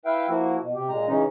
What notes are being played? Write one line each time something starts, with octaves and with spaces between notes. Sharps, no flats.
E4 B4 E5 F5 G5
F3 A#3 E4 F#4
B2
C3 G4
A#2 G#3 A#5
C#3 E3 C#4 D#4